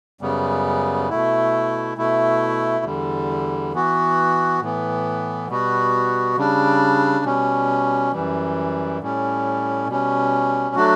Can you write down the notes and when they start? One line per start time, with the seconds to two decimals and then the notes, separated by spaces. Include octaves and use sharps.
0.21 F#2 C#3 G3 B3
1.09 B2 A3 E4
1.97 B2 A3 E4
2.85 E2 D3 G3
3.73 E3 B3 F#4
4.60 A2 E3 B3
5.48 B2 G3 B3 F#4
6.36 C#3 G3 D4
7.24 B2 G3 C#4
8.12 F#2 E3 G3
9.00 A2 G3 C#4
9.87 B2 G3 C#4
10.75 F#3 A3 D4 F#4